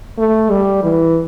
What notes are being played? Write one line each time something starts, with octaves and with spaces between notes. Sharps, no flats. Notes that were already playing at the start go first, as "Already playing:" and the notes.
A3
G3
E3